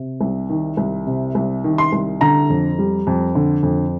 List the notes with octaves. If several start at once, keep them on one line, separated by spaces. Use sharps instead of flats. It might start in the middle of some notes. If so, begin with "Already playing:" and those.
Already playing: C3
C2
D#3
C2
C3
C2
D#3
C6
C2
D3 A#5
F2
G3
F2
D3
F2